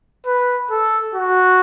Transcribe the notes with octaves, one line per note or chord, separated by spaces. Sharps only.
B4
A4
F#4